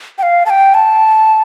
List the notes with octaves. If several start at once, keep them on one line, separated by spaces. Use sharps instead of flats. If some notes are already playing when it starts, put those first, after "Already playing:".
G5
F5
A5
G5
A5